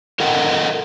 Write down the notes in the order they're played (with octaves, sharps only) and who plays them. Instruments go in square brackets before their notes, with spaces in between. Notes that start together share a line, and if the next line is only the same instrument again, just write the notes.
[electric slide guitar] A4 A#4 D#5 F#5 G5